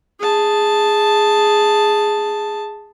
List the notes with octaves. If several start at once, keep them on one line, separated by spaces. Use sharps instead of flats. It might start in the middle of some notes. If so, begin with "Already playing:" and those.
G#4 A5